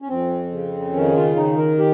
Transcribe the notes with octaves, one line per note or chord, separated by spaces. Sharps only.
C#4
F2 C4
C#3
D#3 C#4
F4
D#3 D#4
A#4
G4